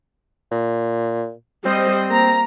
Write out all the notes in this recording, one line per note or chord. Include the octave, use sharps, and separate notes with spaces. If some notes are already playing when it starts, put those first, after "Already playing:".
A#2
G3 C4 C5 D#5
A#3 A#5